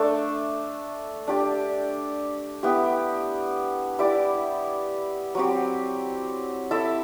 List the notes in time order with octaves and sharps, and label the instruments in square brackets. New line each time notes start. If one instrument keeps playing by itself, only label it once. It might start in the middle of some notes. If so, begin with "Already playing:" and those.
Already playing: [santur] A3 D4 A4
D4 G4 D5
B3 E4 G4
E4 G4 D5
F#3 C4 G4
E4 A4 E5